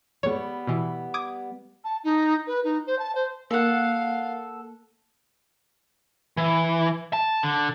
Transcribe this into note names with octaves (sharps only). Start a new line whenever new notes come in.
G3 B3 C#5
B2 E3
D6 D#6 G#6
A5
D#4
B4
D#4
C5
A5
C5
A#3 A4 F5 F#5
E3
A5
D3